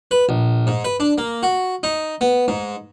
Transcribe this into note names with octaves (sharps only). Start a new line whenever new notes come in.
B4
A#1
G#2
B4
D4
A#3
F#4
D#4
B3
G#2